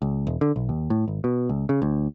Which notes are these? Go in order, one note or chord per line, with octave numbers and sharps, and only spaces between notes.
C#2
E1
D3
B1
D#2
A2
G#1
B2
C#2
C#3
D2